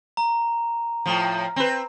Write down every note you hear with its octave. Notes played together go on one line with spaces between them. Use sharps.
A#5
A2 F3
C4 B4